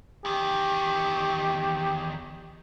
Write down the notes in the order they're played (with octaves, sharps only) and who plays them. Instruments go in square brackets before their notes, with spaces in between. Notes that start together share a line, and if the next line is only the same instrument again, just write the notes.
[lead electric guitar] E2 D#3 [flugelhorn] G4